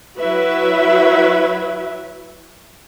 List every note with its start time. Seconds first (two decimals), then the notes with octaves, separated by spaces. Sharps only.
0.18 F#3 E4 F#4 B4 E5